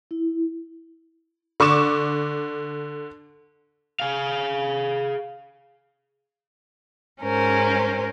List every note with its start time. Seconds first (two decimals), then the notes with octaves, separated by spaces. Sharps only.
0.11 E4
1.60 D3 C#6 D6 E7
4.00 G#4 F5
7.22 G#2 C#4 A#4 C5